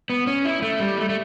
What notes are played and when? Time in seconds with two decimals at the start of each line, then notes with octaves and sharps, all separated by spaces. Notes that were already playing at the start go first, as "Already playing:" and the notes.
0.10 B3
0.27 C#4
0.45 E4
0.62 A3
0.80 G3
0.98 A3
1.09 A3